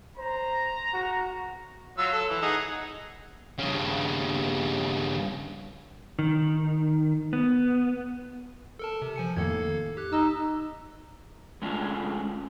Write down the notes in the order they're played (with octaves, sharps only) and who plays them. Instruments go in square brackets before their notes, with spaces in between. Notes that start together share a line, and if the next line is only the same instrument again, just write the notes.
[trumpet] C5 [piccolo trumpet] A#5
[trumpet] F#4
[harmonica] F#3 F4 E6
A4
E3
D#4 G#4 F#5
[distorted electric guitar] G2 C#3
[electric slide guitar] D#3
B3
[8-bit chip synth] A4 A#4 A5
C3
F3 G#5 C#7
[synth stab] F2 A2 D#3 [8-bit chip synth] A#3 A4 G#6
[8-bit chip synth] G4 F#6
[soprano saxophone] D#4 [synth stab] E6
[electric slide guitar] G#3 A3 C#4 D4 E4 F4